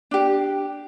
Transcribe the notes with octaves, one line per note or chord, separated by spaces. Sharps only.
D4 G4